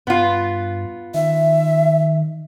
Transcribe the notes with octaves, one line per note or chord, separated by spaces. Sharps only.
G2 B3 F4
D#3 E5